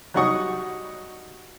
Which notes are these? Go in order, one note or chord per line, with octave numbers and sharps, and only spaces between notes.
F#3 G3 D#4 F#5 C#6 D#6